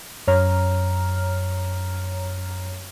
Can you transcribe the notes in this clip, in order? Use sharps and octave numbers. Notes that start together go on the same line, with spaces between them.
F#2 C#5 A#5 F6